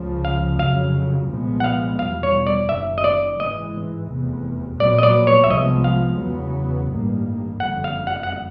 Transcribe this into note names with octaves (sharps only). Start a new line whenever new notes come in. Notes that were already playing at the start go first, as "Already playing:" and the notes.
Already playing: C#2 C#3 F3
F5
F2 C#3 F#3 F5
C2 A#2 F3 G#3 B3
F#5
F5
E2 B2 G3 F5
C#5
D5
F#1 F#2 D#3 E5
D#5
D5
G#2 E3 G#3 D#5
F1 E2 C3
A#1 A#2 F#3 B3 D5
D#5
D5
C#5
E5
C2 C3 F3 G#3 B3 D#5
F5
E2 C#3 F#3 B3
A1 G2 D#3 G3 A#3
F#1 F2 D3 G3 F#5
F5
F#5
F#5